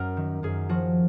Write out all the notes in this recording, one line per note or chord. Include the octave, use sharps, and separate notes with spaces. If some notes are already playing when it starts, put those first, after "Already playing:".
Already playing: F#2 A#4
D#3
F#2 G#4
F3 F#4